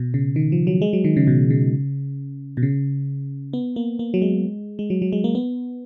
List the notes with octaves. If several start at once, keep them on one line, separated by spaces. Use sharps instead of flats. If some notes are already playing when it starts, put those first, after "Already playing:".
Already playing: B2
C#3
D#3
F3
F#3
G#3
F#3
D#3
C#3
B2
C#3
B2
C#3
B3
A#3
A#3
F#3
G#3
G#3
F#3
F#3
G#3
A#3
B3